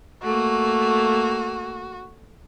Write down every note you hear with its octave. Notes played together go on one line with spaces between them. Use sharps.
A3 A#3 F#4